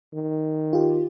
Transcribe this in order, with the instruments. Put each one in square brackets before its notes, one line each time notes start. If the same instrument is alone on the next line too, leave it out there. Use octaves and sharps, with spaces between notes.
[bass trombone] D#3
[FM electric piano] F4 G4